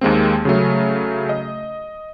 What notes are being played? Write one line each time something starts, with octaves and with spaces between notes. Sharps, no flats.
D#2 G#3 A#3 C4
C#3 F#3 A3
D#5